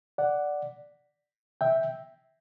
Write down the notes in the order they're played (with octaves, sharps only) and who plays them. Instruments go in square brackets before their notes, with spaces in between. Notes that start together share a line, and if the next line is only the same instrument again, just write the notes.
[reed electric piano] D5 F#5
E5 G5